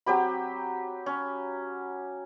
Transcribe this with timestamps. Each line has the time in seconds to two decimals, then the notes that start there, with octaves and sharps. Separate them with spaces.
0.06 F#3 C4 G4 B5
1.06 C#4